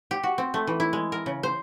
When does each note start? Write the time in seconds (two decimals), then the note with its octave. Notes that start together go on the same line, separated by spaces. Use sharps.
0.11 G4
0.23 F#4
0.38 C4
0.54 A3
0.67 E3
0.80 E4
0.93 G#3
1.12 A#4
1.26 C#3
1.43 C5